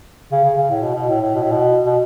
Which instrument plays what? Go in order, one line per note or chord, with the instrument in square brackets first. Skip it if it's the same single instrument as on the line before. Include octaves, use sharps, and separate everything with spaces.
[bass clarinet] C#3
C#3
C#3
A2
B2
B2
A2
A2
B2
A2
B2
B2